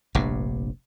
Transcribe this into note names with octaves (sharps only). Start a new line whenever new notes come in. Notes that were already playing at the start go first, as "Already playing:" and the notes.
F1 A#1 G2